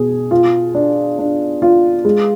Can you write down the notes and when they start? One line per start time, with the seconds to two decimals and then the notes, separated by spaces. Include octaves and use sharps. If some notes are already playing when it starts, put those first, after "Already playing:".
Already playing: B2 G#4
0.31 F4
0.75 D4
1.19 D4
1.62 F4
2.05 G#3